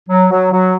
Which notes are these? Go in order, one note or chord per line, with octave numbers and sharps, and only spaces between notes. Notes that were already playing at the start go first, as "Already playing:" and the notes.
F#3
F#3
F#3